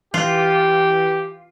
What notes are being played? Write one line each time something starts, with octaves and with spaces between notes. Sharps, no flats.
E3 F4 G4